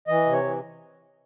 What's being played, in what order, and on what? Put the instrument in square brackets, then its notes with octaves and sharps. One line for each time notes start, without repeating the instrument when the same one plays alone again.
[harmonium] E3 D#5
C3
C#5
E3